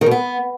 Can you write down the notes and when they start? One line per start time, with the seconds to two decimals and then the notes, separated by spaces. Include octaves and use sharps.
0.01 D#3
0.06 B2
0.11 B3